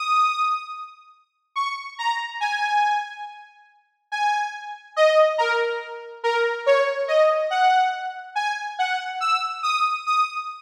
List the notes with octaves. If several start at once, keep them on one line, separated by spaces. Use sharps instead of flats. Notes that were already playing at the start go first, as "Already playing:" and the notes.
Already playing: D#6
C#6
A#5
G#5
G#5
D#5
A#4
A#4
C#5
D#5
F#5
G#5
F#5
E6
D#6
D#6